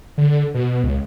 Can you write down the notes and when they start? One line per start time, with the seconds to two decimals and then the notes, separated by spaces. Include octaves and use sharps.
0.18 D3
0.54 B2
0.84 C#2